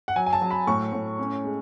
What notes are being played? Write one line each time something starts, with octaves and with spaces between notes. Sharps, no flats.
F#5
F#3 G#5
G#5
A5
F#3
B5
A2 C#6
A2
C#4
G#3